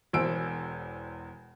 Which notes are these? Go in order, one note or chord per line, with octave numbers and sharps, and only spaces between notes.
E1 E2 C5 E6 D7